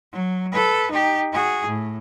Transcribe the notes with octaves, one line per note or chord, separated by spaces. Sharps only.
F#3
A4 B4
D#4 G4
F#4 G#4
A2